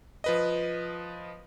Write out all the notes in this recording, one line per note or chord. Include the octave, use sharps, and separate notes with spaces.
F3 B4 D#5